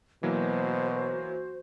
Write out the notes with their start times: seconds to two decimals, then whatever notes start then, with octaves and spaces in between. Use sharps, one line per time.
0.23 B2 E3 F#3 A#3 F#4 C5